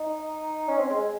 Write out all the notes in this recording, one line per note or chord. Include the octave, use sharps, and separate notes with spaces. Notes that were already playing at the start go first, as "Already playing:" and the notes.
Already playing: D#4
C#4
C4
G#3
G#3